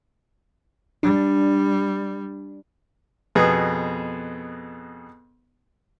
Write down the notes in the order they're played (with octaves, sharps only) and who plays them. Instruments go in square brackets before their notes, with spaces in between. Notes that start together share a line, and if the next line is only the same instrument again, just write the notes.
[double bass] G3 [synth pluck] D4
[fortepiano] F2 B2 B3 G#4